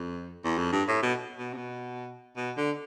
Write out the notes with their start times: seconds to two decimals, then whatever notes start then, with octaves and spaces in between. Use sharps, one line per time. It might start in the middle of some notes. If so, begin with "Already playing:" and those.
Already playing: F2
0.44 E2
0.58 F2
0.72 G2
0.88 A2
1.03 B2
1.37 B2
1.53 C3
1.57 B2
2.37 B2
2.57 D3